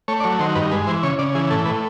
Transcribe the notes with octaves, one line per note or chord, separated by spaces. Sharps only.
A3 C#5
D5
F#3 C#5
D#3 C5
G2 B4
G#3 B4
E3 C5
C#3 C#5
C#3 D5
E3 G#4
A2 A4
A2 B4